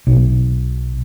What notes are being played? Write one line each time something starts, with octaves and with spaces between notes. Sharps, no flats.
B1